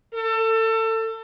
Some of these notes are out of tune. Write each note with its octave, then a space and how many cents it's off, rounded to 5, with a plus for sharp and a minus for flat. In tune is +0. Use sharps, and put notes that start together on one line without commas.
A4 +30